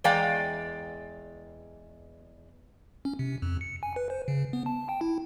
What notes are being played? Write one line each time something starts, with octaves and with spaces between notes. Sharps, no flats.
E2 G#3 D5 F5 G5 A#5
C#4
C3
F2
C#7
G#5
B4
C5
C#3
B3
A5
G5
E4